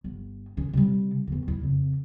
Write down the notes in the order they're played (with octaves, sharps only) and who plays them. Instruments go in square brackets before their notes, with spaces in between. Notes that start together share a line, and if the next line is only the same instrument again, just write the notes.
[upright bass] G1
D#3 C#4
C3 G3
E2 D3
D2 E4
F2 C#3